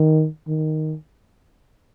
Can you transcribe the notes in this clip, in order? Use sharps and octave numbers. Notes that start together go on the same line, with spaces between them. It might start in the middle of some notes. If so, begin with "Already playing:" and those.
Already playing: D#3
D#3